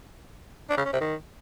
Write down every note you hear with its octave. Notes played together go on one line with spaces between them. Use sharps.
D4
C#3
C#4
C3
D#3